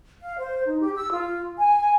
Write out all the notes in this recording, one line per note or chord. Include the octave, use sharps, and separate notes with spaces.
F5
C5
D#4
G4
E6
F4
G#5